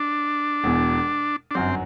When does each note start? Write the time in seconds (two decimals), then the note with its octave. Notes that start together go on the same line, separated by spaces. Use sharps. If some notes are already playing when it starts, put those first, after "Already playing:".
Already playing: D4
0.64 E1 E2 B2
1.51 D4
1.55 G1 F#2 F#3 C4